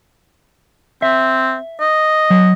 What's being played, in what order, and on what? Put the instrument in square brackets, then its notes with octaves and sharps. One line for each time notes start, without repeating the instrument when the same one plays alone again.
[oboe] C4 [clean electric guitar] E5
[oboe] D#5
[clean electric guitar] F#3